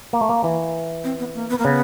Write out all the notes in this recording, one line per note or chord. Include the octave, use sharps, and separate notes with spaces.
A#3
A3
A#3
E3
C4
B3
A#3
B3
A#3
C#3 B3